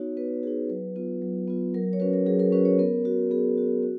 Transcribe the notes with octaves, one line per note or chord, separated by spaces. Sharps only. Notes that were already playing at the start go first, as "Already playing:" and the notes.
Already playing: B3 D#4 F#4 C#5
B3 B4
D#4 F#4 G#4
F#3 B4
B3 F4
F#3
B3 F4
F#3 A#4
C#5
C#4 F#4 B4
A#4
F#3 G#4
A#4
C#4 F#4 B4
C#5
B3 A#4
F#4
B3 G#4
F#4
F#4